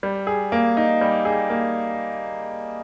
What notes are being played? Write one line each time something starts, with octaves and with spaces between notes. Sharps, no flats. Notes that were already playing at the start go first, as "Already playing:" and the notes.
G3
G#4
A#3
D#4
G3
G#4
A#3